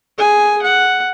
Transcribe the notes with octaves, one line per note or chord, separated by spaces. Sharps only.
G#4 G#5
F#5